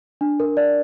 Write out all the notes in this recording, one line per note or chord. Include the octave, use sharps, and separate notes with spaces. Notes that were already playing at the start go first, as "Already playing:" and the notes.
D4
A#4
D5